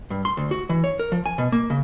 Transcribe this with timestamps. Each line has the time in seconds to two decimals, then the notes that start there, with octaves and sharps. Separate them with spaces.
0.10 G2
0.25 C6
0.37 D2
0.51 F#4
0.69 E3
0.84 C#5
0.99 A#4
1.12 F3
1.26 G#5
1.38 B2
1.52 A#3
1.70 C#3